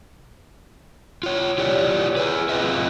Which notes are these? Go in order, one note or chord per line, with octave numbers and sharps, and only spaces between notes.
F4 C#5
E4 F4 G4 C#5 D5
G#4 B4
C4 F4 B4 D#5 E5